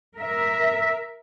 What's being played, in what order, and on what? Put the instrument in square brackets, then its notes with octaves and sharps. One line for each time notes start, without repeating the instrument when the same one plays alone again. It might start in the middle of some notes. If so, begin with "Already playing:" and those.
[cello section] A#4 E5